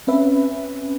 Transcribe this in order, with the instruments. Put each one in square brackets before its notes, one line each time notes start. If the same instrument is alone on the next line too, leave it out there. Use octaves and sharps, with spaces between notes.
[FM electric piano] C4 C#4 B4 E5